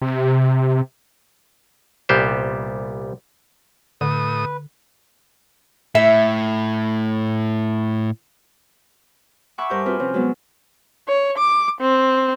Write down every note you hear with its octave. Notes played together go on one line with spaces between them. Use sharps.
C3
C2 A#2 G3 B3 G4 C5
A2 D3 B4 D#6
A2 E5
E5 F#5 G#5 B5 C#6 D6
G2 A#4 C5 G#5 D6 G6
C4 F4 F#4 B4
C3 F3 C4 C#4
F#3 G#3 B3
C#5
D6
C4